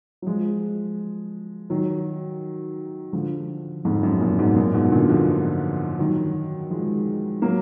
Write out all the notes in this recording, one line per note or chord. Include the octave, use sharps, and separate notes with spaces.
F#3
F3 G#3
D#3 F#3
D3 F3
F2 G#2
F#2
F#2 A#2
G#2 B2
F#2 A#2
G#2 B2
A#2 D3
D3 F3
D#3 F#3
F3 G#3
F#3 A#3